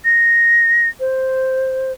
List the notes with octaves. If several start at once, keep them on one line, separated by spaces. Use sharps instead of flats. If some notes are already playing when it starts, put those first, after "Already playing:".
A#6
C5